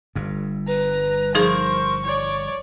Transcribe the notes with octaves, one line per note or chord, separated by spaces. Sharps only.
G1 G2
B4 A#5
F3 D#4 G#4 A#4 C5 C#6
C#5 D5